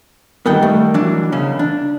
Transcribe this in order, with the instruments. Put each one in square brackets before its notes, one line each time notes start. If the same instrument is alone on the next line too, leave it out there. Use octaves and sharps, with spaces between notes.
[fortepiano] D#3 G3 A#3 [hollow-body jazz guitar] B3 F#5 G5
[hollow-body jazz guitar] A3
E3 F#3 D4
E2 C#3 C#4
D4